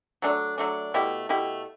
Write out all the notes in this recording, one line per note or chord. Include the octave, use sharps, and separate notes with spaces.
F#3 A3 D4
F#3 A3 D4
B2 A3 E4 G4
B2 A3 E4 G4